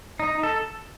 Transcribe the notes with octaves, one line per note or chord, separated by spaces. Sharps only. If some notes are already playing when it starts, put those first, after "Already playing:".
D#4
A4